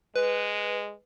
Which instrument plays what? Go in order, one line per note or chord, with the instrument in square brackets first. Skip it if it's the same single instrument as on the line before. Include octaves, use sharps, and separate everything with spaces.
[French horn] G#3 [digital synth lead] B4